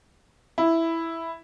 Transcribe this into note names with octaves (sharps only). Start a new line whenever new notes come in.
E4